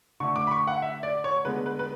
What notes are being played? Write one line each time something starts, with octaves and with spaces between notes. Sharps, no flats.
D3 A3 C#6
D6
B5
C#6
F#5
E5
D5
C#5
D3 G#3 B3 B4
B4
B4